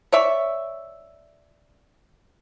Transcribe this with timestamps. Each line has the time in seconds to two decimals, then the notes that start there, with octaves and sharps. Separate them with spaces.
0.12 C#5 D5 E5